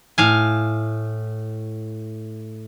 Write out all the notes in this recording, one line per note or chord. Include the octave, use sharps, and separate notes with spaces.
A2 F5 G#5